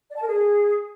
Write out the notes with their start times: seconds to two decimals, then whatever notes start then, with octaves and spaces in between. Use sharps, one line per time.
0.10 D5
0.16 A5
0.21 A#4
0.27 G#4